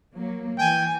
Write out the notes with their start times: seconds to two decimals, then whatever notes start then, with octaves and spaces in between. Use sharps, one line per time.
0.17 F#3 A#3
0.59 E3 G5 G#5